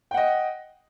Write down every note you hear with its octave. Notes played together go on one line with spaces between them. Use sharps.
D#5 F#5 G5